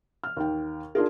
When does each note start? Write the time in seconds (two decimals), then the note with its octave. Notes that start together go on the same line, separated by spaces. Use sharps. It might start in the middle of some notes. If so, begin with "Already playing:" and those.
0.24 F6
0.37 D#2 D#3 G5
0.95 D4 F4 G#4 A#4